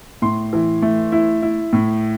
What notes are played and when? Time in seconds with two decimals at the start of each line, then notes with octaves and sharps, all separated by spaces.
0.22 A2 C6
0.53 E3
0.82 A3
1.12 E4
1.42 E4
1.73 A2